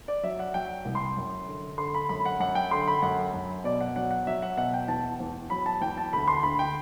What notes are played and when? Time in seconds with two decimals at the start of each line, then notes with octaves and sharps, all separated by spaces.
0.08 D5
0.23 F#3 E5
0.39 F#5
0.54 F#3 G5
0.85 C2
0.95 C6
1.17 F#2
1.47 D3
1.78 D3 C6
1.94 B5
2.09 F#2 B5
2.25 F#5
2.40 F#2 F#5
2.55 G5
2.71 D3 C6
2.87 B5
3.02 F#2 F#5
3.33 F#2
3.64 B2 D5
3.81 F#5
3.96 F#3 F#5
4.11 F#5
4.27 F#3 E5
4.42 F#5
4.57 B2 F#5
4.74 G5
4.88 E2 A5
5.20 E2
5.50 F#3 B5
5.66 A5
5.81 E2 G5
5.98 A5
6.13 D2 B5
6.28 C6
6.43 D2 B5
6.59 G5